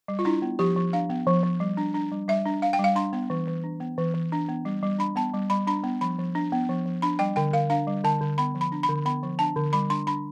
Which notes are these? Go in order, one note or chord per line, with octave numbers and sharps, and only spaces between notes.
G3
F4
D4 E4
B3
F3 G4
F3
D4 F5
B3
F3
F3
G3
D4
D4
G3
G3 E5
D4
D4 F5
G5
G3
F5
D4 C6
B3
E3
E3
D4
B3
E3
E3
D4
B3
G3
G3
D4 B5
B3 A5
G3
G3 B5
D4 B5
B3
F3 B5
F3
D4
B3
F3
F3
D4 B5
G3 G5
D3 G5
D3 F5
D4 F5
G3
D3 A5
D3
B3 B5
F3
B5
D4
B5
D3
B3 B5
F3
D4 A5
D3
G3 B5
D4 C6
D4 B5